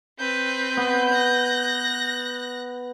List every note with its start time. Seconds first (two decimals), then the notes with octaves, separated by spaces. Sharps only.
0.19 C4 B4 G6
0.77 B3
1.10 F#6 A#6